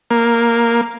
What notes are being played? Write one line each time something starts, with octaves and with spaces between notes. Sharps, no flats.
A#3